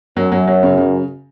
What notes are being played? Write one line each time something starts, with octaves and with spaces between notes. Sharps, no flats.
F#2 F#3
F#3
F#3
C#3
C#3